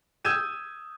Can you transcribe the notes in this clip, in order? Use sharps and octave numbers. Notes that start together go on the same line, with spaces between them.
D#6 E6 G6 G#6 D#7 E7